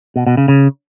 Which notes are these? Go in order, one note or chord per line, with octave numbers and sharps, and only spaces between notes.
B2
B2
C#3
C#3